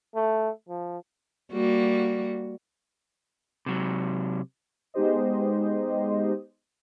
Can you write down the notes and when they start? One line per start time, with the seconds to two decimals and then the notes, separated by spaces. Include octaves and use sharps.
0.15 A3
0.68 F3
1.52 G3 A#3 F#4
3.66 C3 F#3
4.94 G#3 B3 D#4 G4 C5 D#5